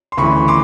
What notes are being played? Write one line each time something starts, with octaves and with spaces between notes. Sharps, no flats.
C6
D2 C#3 E3 B5 C#6
C6 D6